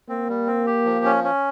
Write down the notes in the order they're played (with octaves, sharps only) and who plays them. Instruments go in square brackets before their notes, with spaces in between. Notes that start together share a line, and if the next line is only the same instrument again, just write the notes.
[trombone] A#3 [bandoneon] C4
[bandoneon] G3
C4
G4
F3
C#4
C#4